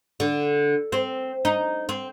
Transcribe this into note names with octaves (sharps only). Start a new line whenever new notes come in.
D3
C4
D#4
C4